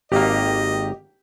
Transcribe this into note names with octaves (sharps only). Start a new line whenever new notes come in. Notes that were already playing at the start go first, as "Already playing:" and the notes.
G#1 A#3 G4 D#5